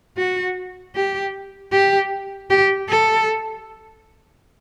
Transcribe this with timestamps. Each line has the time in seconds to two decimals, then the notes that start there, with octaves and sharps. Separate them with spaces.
0.17 F#4
0.95 G4
1.72 G4
2.50 G4
2.88 A4